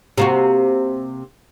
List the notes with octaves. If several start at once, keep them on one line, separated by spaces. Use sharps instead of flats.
C3 A#3 F#4